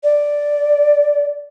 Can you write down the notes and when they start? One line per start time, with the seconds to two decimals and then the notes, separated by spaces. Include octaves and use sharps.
0.04 D5